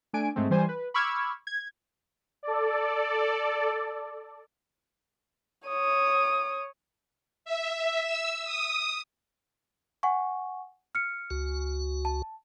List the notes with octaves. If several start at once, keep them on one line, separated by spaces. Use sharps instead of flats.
A3 D4 G#5 D7
G#2 G#3 A3 C4
E3 G3 C5 G#5
B4
B5 C#6 D6 E6 F6 G#6
G#6
A4 D5
C#5 D#6
E5
E6
D#6
F#5 G#5 C#6
F6 C#7
C#2 F#4
A5